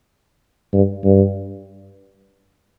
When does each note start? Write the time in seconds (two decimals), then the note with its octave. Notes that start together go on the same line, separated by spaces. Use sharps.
0.73 G2
1.04 G2